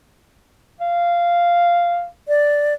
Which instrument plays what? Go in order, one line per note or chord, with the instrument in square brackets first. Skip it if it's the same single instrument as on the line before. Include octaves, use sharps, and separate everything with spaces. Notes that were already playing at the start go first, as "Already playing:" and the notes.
[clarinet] F5
[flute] D5